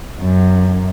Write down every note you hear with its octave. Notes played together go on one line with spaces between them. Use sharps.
F#2